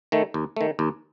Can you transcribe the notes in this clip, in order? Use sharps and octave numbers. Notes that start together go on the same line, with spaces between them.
D#3 A3
D#2
D#3 A3
D#2